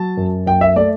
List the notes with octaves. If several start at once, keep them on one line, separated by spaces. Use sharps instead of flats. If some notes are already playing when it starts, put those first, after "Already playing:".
Already playing: F#3 A5
F#2
F#2 G5
E5
A3 D5